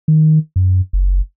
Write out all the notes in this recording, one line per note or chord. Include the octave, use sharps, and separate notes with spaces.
D#3
F#2
F#1